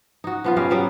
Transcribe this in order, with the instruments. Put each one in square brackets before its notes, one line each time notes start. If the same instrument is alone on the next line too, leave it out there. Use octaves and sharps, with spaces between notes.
[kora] D#4 F#4
F3 B3 F4
G3 C#4 D#5 F5
F#3 G3 B3